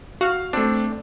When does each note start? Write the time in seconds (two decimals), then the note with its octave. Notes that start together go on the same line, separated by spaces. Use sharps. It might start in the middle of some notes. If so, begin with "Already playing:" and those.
0.21 F#4 F5 F6
0.53 A3 C4 D4